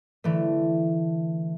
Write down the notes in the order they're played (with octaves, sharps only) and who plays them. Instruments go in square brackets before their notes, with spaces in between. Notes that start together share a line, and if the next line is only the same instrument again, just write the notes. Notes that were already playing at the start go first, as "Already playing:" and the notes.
[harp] D3 E3 A3